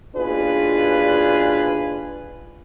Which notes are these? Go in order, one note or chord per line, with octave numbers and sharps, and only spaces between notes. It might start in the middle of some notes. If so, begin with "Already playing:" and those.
D#2 B2 D4 F4 G#4 B4